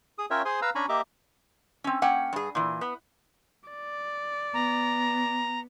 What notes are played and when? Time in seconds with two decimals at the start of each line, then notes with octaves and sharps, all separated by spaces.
0.18 G#4 D#6
0.30 C#4 F4 A#4 C#5 E5 G5
0.45 G#4 C5 G#5 C6 D#6
0.62 B4 F5 A#5 E6
0.75 C#4 D4 G#5 A#5 B5 C#6
0.89 A#3 G4 D#5 E5 A#5 D6
1.84 C4 C#4
2.02 A#3 C#4 F#5 G5
2.33 G2 G#4
2.55 A#2 E3
2.81 B3
3.70 D5
4.54 B3 A#5